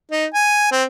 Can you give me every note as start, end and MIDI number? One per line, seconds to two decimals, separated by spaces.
0.12 0.26 63
0.34 0.70 80
0.72 0.84 60